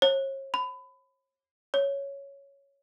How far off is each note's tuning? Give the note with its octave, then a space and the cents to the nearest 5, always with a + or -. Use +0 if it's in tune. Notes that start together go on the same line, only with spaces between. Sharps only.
C#5 -40
B5 +25
C#5 +5